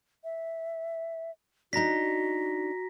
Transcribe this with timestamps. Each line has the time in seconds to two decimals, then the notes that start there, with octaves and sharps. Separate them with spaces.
0.24 E5
1.73 D4 D#4 F#4 A#5 A#6 B6